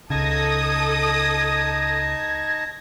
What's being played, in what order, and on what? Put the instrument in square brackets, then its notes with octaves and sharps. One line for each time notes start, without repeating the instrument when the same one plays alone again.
[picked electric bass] C#2 C#3 [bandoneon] D#4 A5 [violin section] A4 D#6 [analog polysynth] G#6 A#6